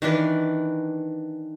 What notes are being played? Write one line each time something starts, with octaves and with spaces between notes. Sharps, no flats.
D#3 E3 D4 B4